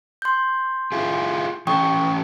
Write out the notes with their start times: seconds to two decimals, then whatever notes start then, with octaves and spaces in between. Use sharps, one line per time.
0.22 C6 G6
0.92 E4 F4 G#4
1.67 E3 C#4 A4 G5 C#6 D#6